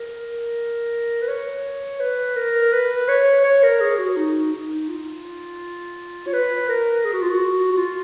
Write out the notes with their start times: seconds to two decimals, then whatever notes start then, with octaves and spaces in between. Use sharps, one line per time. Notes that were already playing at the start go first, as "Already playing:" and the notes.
Already playing: A#4
1.22 B4
1.28 C#5
2.00 B4
2.36 A#4
2.72 B4
3.08 C#5
3.44 C#5
3.63 A#4
3.80 G#4
3.98 F#4
4.16 D#4
4.52 D#4
4.88 F4
6.27 C#5
6.33 B4
6.69 A#4
7.05 G#4
7.13 F#4
7.22 F4
7.30 F#4
7.71 F#4
7.77 F4